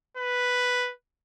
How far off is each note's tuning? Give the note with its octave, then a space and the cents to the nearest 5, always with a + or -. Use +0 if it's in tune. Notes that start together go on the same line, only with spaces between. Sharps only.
B4 +0